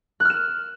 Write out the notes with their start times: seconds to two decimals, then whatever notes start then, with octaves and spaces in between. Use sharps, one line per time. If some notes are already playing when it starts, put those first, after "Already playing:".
0.20 F#6
0.25 F6
0.30 E7